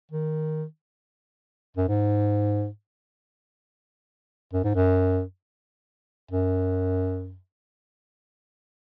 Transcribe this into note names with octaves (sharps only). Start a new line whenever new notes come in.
D#3
F#2
G#2
F#2
G#2
F#2
F#2